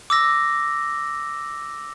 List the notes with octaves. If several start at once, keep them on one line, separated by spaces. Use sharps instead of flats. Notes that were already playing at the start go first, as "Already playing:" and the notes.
D6 E6 A#6